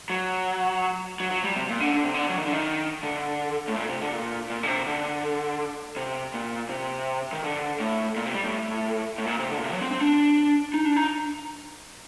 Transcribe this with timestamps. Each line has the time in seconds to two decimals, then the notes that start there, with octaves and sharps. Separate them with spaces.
0.10 F#3
1.20 F#3
1.31 F#3
1.44 G3
1.56 C3
1.69 A#2
1.80 D3
1.94 D3
2.04 C3
2.14 D3
2.30 F#3
2.38 D#3
2.46 D3
2.53 D#3
3.03 D3
3.68 A2
3.76 A#2
3.89 C3
4.01 D3
4.13 A#2
4.50 A#2
4.63 D3
4.67 C3
4.86 D3
5.96 C3
6.34 A#2
6.69 C3
7.33 D#3
7.44 D3
7.80 A2
8.16 A#2
8.26 C3
8.34 G3
8.44 A2
9.18 A2
9.26 A#2
9.39 C3
9.51 D3
9.58 A#2
9.64 C3
9.73 F#3
9.81 C4
9.91 C4
10.00 D4
10.74 D#4
10.85 D4
10.96 D#4